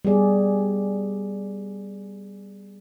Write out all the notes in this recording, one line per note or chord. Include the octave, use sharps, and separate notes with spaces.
G3 B3 G#4 D5